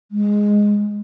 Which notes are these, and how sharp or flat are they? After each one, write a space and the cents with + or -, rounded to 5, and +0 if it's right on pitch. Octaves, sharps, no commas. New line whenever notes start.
G#3 -5